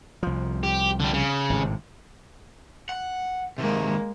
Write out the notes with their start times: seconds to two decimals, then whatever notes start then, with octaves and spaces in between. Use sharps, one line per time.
0.23 C2 F3
0.63 G4
1.00 D3 G3
1.13 C#3
1.50 G#1 A2 C3
2.89 F#5
3.58 C3 D#3 G#3 A#3